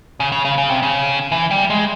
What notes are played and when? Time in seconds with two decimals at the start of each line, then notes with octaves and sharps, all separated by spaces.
0.20 C#3
0.32 C#3
0.45 C#3
0.58 C#3
0.70 C3
0.83 C#3
1.32 E3
1.51 G3
1.70 G#3